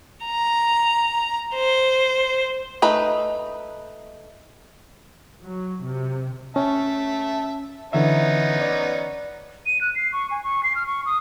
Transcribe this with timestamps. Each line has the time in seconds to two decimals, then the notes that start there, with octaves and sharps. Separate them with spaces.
0.24 A#5
1.54 C5
2.82 A3 D#4 B4
5.42 F#3
5.86 C3
6.56 C#4 E5 A5
7.93 D3 E3 B3 C#4 D#4 E5
8.61 D5
9.66 D#7
9.81 F#6
9.95 C7
10.13 C#6
10.31 G#5
10.44 C#6
10.63 C7
10.75 F6
10.87 C#6
11.06 D#6